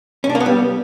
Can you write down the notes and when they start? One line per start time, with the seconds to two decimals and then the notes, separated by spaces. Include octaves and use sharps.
0.24 C#4
0.29 D4
0.35 A#3
0.40 B3
0.46 G3